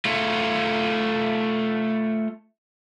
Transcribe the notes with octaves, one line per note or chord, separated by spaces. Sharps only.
A3 F4